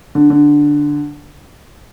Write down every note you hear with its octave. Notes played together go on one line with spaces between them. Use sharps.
D3
D3